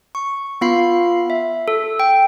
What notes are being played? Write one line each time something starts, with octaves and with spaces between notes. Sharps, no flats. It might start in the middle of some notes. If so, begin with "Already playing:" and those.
C#6
B3 F4 F5 B5 C7
E5
A4
G5